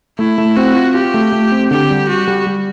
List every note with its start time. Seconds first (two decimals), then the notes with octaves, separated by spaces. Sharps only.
0.19 A3 E4
0.38 A3
0.56 C4 F#4
0.76 F4
0.94 F4 G4
1.14 A3
1.32 A3
1.52 C4
1.71 D3 G4
1.90 G3
2.09 G3 F#4
2.28 G3
2.47 G3